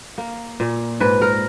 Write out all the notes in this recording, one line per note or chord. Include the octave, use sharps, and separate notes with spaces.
A#3
A#2
G#2 B4
A#4